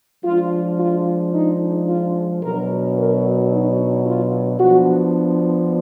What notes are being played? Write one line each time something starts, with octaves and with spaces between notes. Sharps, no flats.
F3 G#3 D4 F4
F4
D#4
F4
B2 F#3 D4 A#4
A#4
D#4
F4
F3 B3 D4 F#4